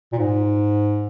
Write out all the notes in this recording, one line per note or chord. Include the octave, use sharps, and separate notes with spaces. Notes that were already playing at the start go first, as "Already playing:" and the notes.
A#2
G#2